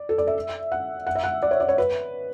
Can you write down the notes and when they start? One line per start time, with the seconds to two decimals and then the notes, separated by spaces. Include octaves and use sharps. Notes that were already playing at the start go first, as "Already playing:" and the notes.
Already playing: D5
0.09 A4
0.18 D5
0.27 E5
0.72 F#5
1.07 F#5
1.15 E5
1.24 F#5
1.42 D5
1.51 C#5
1.60 D5
1.69 C#5
1.78 B4